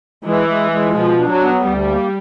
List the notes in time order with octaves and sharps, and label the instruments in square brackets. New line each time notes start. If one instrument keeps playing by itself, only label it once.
[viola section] E3 [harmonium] G#3
[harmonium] G#3
G#3
[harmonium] B2 [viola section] F3
[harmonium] D4
[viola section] F#3
[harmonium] B3
[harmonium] D2 [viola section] G3
[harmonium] A#3